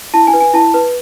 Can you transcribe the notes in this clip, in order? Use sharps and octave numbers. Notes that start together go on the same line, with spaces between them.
E4 A5
G#5
B4
G#5
E4 A5
B4